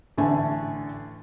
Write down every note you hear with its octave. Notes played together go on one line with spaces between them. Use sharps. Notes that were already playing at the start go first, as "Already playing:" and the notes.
A1 D3 A3 G#5